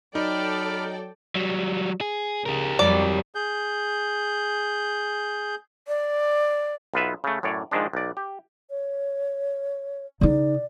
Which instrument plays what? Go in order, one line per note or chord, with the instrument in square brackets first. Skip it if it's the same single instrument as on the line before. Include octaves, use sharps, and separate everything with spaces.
[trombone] F#3 [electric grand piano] D#4 [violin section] A4 D5 G5 [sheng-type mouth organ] B5 D6 F6
[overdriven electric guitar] F#3 G3
G#4
[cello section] C#3 [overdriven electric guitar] G4 A#4
[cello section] F2 F#3 G3 [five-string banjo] D5
[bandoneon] G#4 G6
[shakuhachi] D5
[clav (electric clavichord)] B1 B3 F4 B4 E5
C#3 A3
F#2 A2 C#5 D5
G#2 D#3 F3 G#3 D4
B1 D5
G4
[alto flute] C#5
[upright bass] C#3 D#4 [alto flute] D5